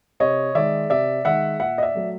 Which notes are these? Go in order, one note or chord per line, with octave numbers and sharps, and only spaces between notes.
C3 C#5 D#5
D#3 G#3 D5 E5
C3 D5 E5
D#3 G#3 E5 F#5
A#2 E5 F#5
D#5
D5 E5
F#3 A3